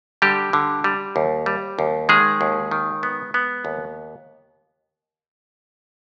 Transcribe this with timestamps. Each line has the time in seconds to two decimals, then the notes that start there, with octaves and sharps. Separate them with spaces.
0.22 D3 G3 G4
0.53 D3
0.84 G3
1.16 D#2
1.46 G3
1.79 D#2
2.09 D#3 G#3 G#4
2.41 D#2
2.71 D#3
3.03 B3
3.34 B3
3.65 D#2